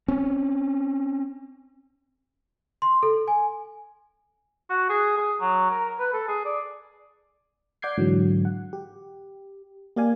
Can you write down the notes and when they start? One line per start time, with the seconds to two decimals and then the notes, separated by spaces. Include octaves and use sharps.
0.08 C4 C#4
2.82 C6
3.03 A4
3.28 G#5
4.70 F#4
4.89 G#4
5.18 G#4
5.40 F#3
5.70 A#4
5.99 B4
6.13 A4
6.28 G#4
6.45 D5
7.82 D5 F#5 D6 G6 G#6 C7
7.97 G#2 D3 E3 F#3
8.45 F#5
8.73 G4
9.96 A#3 G4 D5 F5 G#5